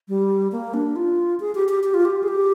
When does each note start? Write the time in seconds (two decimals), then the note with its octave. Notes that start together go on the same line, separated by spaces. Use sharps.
0.09 G3
0.52 A#3
0.74 D4
0.96 F4
1.40 G#4
1.55 G4
1.69 G4
1.84 G4
1.94 F4
2.05 G4
2.23 G#4
2.28 G4